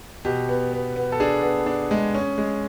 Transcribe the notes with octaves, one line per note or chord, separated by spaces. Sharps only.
B2 G4
B3
B3
B3
A4
D4 G#4
B3
D4
G#3
C#4
G#3